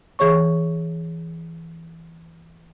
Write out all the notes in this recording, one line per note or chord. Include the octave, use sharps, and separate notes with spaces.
E3 G#4 C#5 C#6